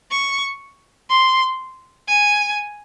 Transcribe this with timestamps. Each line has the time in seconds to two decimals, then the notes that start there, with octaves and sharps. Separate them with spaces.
0.11 C#6
1.10 C6
2.08 G#5